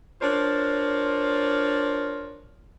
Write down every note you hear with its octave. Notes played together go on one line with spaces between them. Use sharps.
D4 F4 A#4 C5 C#5